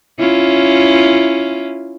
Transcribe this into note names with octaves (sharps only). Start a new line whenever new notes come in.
C#4 E4 F4